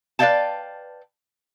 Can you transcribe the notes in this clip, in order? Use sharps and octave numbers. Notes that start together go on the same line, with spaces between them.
B4 D5 E5 F5 G5 A5